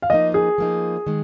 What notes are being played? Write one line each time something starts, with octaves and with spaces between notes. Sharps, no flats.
F5
F3 A#3 D#4 D#5
G#4
F3 A#3 D#4
D#3 G#3